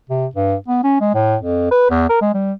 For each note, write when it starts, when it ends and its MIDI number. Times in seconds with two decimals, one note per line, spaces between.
0.10 0.26 48
0.36 0.55 43
0.68 0.83 59
0.84 0.97 61
1.01 1.12 56
1.14 1.36 45
1.41 1.67 41
1.71 1.87 71
1.90 2.09 40
2.09 2.20 70
2.22 2.32 56
2.35 2.52 55